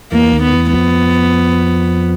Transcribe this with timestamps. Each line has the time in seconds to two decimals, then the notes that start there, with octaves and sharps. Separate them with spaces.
0.12 E2 E3 A#3
0.33 D#2 D#3
0.43 B3
0.53 E2 E3
0.73 F2 F3 B3